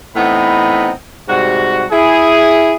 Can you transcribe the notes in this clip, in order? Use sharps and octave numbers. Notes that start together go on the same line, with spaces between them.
A2 E3 B3 C4 D#4 B5
G#2 C3 G3 F#4
E4 G#4